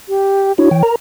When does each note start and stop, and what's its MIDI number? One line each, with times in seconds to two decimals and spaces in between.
0.09 0.52 67
0.58 0.69 62
0.58 0.69 64
0.58 0.69 66
0.58 0.83 73
0.71 0.83 52
0.71 0.83 79
0.83 0.96 70
0.83 0.96 82